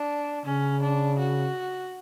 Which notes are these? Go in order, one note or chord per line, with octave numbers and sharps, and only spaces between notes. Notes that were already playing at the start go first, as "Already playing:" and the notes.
Already playing: D4
C#3 C#4
D4
F#4